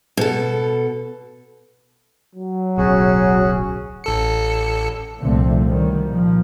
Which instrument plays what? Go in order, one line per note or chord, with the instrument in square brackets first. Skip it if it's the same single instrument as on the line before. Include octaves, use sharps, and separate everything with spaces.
[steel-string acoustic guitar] B2 A4
[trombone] F#3
[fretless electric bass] D1 B1 [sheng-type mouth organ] C#4 F#4 G#4
[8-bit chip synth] A1 A4 C#7
[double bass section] C2 A#2 D3 F3 A3 C4
D#3 F#3 G3
A#2 F3